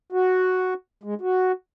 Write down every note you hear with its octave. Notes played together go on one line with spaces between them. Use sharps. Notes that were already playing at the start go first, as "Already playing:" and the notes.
F#4
G#3
F#4